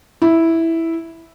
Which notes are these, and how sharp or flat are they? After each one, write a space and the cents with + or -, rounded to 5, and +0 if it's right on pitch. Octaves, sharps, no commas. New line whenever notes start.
E4 -5